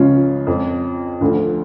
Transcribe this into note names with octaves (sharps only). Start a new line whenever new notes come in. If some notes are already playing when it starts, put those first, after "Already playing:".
Already playing: C#2 C#3 F3 C#4 F4
F2 F3
D2 D3 F3